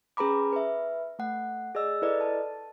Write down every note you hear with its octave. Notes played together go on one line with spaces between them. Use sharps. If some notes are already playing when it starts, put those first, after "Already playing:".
C#4 G#4 B4 A#5 B5 D6
B4 E5
A3 F#5
G#4 D5 D#5 E6
E4 A4 B4 D5 D#5
A5